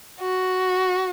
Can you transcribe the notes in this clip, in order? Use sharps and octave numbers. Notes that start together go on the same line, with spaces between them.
F#4